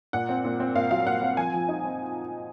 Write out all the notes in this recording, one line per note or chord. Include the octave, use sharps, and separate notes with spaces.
A#2 F#5
C4
A#2
C4
A#2 F5
F#3 F5
A#2 F#5
C4
F3 G#5
F3
D#4
C4